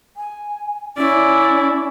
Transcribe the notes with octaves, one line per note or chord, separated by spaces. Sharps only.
G#5
C#4 E4 D5